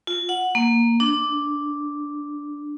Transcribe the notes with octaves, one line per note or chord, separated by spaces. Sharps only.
F4
F#5
A#3
D4